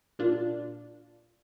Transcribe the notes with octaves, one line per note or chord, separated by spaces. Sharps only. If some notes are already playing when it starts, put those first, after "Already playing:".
A#2 D4 F4